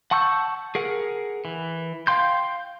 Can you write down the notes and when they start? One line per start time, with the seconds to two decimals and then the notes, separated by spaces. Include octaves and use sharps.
0.11 F#5 A5 C#6 E6 G6
0.75 G#4 A#4 F#5
1.45 E3
2.07 F5 G5 C6 G6